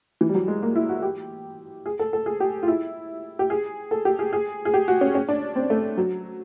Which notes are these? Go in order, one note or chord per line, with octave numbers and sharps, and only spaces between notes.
E3
G3
F#3
G#3
A#3
E4
F#4
G4
G#4
A4
A4
G#4
G4
F4
E4
G4
G#4
A4
G4
G#4
G#4
G#4
G4
F#4
C#4
C#4
D4
C4
A3
F#3